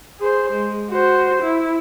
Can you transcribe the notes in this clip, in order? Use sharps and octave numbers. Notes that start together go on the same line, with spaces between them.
G#4 C5
G#3
F#4 C5
E4